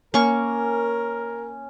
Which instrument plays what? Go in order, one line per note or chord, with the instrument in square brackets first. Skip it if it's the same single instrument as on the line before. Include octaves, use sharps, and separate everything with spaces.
[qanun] A#3 C#6 [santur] C#4 [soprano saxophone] A#4